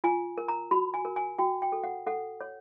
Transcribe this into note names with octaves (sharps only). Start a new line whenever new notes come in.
F4 G#5
A#4
A#5
F#4 B5
G#5
A#4
G#5
F#4 G5
G5
A4
F#5
A4 F#5
C#5